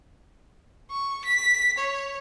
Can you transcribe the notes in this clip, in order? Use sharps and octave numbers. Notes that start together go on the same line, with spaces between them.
C#6
B6
C#5